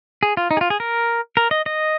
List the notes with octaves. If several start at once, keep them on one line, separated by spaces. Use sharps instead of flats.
G#4
F4
D#4
G#4
F4
G#4
A#4
A#4
D#5
D#5